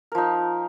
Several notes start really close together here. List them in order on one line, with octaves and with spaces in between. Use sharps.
A#4 F3 D#4